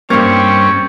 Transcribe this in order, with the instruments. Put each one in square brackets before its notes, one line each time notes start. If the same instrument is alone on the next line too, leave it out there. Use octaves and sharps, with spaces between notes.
[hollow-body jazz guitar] G2 A#3 [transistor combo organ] G3 C#4 [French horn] C4 [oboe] C#6